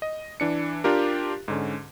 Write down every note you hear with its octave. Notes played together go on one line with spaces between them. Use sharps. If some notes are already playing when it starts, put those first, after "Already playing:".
D#5
E3 D4 C#7
D4 F4 G4 A#4
G#2 D3 C#4